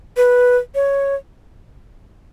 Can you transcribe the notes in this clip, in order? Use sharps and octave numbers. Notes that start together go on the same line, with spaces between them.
B4
C#5